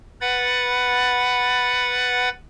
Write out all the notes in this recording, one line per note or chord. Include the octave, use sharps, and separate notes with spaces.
B4 F#5 B5 A6